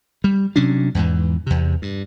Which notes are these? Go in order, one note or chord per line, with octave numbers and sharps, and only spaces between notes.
G3
C3 F#3 C#4 D4
E2 G#2 E3
E2 C3
G2